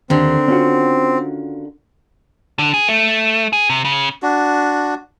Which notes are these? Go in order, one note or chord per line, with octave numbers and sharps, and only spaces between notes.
D#2 D3 D#3 C4
C#4 F4 F#4
D3
G#4
A3
G#4
C3
C#3
D4 F#4